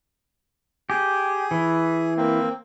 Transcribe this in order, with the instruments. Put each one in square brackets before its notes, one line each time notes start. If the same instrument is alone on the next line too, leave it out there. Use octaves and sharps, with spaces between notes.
[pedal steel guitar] G4 [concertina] G#4 G#5
[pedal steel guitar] E3
[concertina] A#3 C4